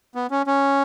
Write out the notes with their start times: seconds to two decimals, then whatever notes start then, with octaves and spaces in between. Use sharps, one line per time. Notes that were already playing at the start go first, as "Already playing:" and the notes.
0.15 B3
0.31 C#4
0.47 C#4